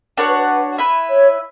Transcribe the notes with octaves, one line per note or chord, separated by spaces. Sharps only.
D4 F#4 A#4 C#5 F#5
B4
B4
E4 B4 E5
C#5